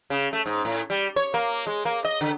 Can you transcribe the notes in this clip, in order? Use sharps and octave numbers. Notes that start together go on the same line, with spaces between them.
C#3
A3
G#2
A2
G3
C#5
A#3
G#3
A#3
D#5
D3